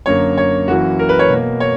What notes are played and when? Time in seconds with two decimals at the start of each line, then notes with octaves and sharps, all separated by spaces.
0.06 F#2 D3 A#3 C#5
0.38 C#5
0.68 F#2 E3 A#3 F#4
0.99 A#4
1.09 B4
1.19 C#5
1.29 B2 A#3
1.60 C#5